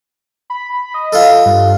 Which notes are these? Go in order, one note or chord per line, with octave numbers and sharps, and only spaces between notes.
B5
D#5
F4 A4
G2